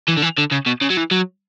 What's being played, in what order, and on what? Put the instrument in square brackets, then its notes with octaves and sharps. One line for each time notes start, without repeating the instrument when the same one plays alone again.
[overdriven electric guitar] E3
D3
E3
D3
C#3
B2
C#3
F#3
E3
F#3